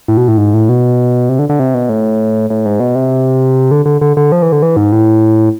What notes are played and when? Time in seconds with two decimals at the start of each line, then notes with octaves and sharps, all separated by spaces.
0.08 A2
0.17 B2
0.28 A2
0.37 G#2
0.54 A2
0.69 B2
1.29 C3
1.39 D3
1.49 D3
1.59 C3
1.74 B2
1.89 A2
2.50 A2
2.65 G#2
2.80 B2
2.95 C3
3.71 D3
3.86 D3
4.01 D3
4.17 D3
4.32 F3
4.42 E3
4.52 D3
4.62 E3
4.76 G#2
4.92 A2